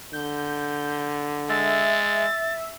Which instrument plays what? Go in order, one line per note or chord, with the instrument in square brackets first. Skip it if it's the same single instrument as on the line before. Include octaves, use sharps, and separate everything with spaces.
[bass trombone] D3 [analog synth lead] G6
[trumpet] G#3 [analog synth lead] E5 [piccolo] A6